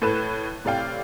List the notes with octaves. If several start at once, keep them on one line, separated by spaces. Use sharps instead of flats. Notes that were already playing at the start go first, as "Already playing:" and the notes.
A2 A4 B4 F#6 E7
A2 C3 D5 F5 G5